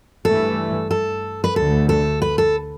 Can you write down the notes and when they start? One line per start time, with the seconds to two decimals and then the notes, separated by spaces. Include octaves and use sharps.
0.24 G2 E3 A3 A4
0.91 A4
1.44 B4
1.56 D2 D3 A3 A4
1.89 A4
2.22 B4
2.38 A4